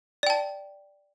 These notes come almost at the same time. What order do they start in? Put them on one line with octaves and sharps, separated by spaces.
D5 G5 A5